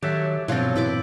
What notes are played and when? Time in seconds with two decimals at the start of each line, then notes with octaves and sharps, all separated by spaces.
0.03 D#3 F#3 G4 A4 E5
0.48 E2 G2 B2 F3 F#3 C4 F4 A4
0.75 A#2 E4 B4 D6